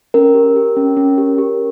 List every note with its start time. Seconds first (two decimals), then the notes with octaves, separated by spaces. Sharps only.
0.14 C#4 A#4
0.34 G4
0.56 G4
0.77 C#4
0.97 C#4
1.18 G4
1.38 G4